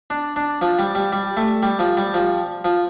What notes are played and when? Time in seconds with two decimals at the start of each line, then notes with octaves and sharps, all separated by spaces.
0.10 D4
0.36 D4
0.61 F3
0.79 G3
0.95 G3
1.13 G3
1.37 A3
1.63 G3
1.79 F3
1.97 G3
2.14 F3
2.65 F3